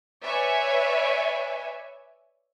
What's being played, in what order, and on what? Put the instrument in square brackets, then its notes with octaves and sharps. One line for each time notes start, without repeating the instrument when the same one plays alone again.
[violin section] B4 C#5 D5 E5 G#5